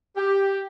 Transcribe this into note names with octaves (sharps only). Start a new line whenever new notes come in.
G4